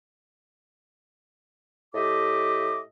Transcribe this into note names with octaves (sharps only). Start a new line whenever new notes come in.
A2 A3 G4 D#5 E5 D6